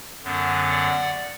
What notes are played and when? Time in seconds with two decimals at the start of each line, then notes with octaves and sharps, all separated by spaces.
0.23 F#2 D3 F#3 B3
0.70 D5 F#5